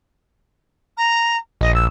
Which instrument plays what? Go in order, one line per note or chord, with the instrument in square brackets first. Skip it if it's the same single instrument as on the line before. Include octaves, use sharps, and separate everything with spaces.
[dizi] A#5
[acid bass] A#1 [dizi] D#5
[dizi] E6